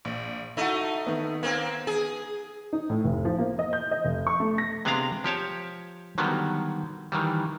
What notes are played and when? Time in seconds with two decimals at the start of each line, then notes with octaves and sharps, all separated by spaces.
0.05 A#1
0.57 A3 D#4 E4 F#4
1.07 D#3 B3
1.43 A#3 C4
1.87 G#4
2.73 D#4
2.90 A2
3.04 F1
3.25 F3
3.38 A#3
3.59 D#5
3.73 G6
3.91 D#5
4.04 F1
4.27 C#6
4.40 A3
4.58 A#6
4.85 C3 G#3 B3 D4 F5 A#5
5.24 F3 G4 C#5 A5
6.18 D3 D#3 F#3 G3 B3
7.12 D#3 E3 G3